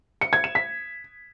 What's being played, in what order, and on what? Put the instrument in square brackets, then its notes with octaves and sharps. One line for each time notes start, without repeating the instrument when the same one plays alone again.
[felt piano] C#7
G#6
E7
B6